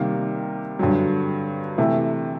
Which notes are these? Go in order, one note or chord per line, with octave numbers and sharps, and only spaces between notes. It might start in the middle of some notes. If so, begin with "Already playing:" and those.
Already playing: C3 D#3 G3 A#3
G2 D3 F#3
C3 E3 A3